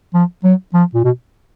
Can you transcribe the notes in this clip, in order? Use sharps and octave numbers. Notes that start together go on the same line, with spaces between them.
F3
F#3
F3
A#2
B2